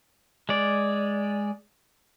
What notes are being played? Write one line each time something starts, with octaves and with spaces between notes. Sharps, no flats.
G#3 D5